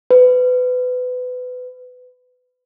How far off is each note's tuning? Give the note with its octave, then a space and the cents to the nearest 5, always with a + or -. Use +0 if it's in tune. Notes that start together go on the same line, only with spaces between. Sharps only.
B4 +25